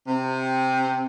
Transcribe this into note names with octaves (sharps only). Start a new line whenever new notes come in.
C3